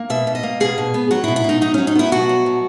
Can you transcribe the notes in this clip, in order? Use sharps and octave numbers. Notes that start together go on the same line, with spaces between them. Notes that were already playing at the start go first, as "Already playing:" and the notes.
Already playing: A#3
B2 E5
B2
D#5
A#3
B2 G#4
B2
B3
F#3 F#4
E4
B2
E4
B2 D#4
F#3 D#4
F#3 C#4
D#4
B3 E4
B2 F#4
F#3
B2